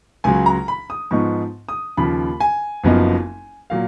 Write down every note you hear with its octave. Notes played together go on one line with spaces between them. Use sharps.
C#2 C#3 F#3 G#5
A#5
B5
D#6
G#2 F3 B3 D#4 C#6
D#6
D#2 C#3 F3 B5
G#5
F#1 F#2 F3 B3 D#4
A#2 F#3 F5